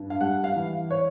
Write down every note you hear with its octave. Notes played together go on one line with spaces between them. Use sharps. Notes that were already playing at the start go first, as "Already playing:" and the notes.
Already playing: G2
F5
G3 F#5
F5
E3
C#5